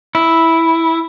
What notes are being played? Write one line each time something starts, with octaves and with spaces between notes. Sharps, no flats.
E4